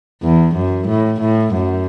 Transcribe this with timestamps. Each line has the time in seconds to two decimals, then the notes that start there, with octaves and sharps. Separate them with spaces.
0.22 E2
0.54 F#2
0.87 A2
1.20 A2
1.53 F#2